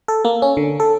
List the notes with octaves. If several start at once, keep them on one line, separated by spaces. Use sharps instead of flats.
A4
A#3
C#4
D3
A4